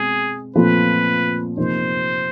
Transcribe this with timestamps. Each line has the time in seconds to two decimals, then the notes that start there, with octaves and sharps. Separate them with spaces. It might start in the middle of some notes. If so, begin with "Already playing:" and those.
Already playing: B2 G#3 C4 G#4
0.55 A#2 F3 A3 C4 B4
1.57 C3 F3 A#3 D#4 C5